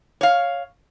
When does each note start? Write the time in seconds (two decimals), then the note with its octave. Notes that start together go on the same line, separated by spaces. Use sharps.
0.21 C#5 F5